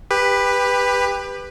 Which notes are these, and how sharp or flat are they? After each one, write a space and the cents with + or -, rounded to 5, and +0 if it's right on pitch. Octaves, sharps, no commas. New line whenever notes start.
G4 +25 B4 +0